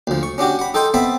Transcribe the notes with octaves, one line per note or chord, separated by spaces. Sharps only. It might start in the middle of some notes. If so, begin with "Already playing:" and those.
D2 F3
C#6
C#4 D4 F#4 G4
F#5 B5
D#4 A4 G5 A5 C6
B3 C4 E5 A5 B5